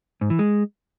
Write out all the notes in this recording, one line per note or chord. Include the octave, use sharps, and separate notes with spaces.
G#2
E3
G#3